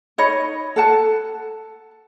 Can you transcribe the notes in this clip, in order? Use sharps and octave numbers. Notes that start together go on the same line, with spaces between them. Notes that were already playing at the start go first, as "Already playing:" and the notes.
D#4 C#5 D#5 B5
A4 F#5 A5